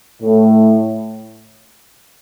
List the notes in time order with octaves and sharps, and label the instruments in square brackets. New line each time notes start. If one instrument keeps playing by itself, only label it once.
[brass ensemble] A2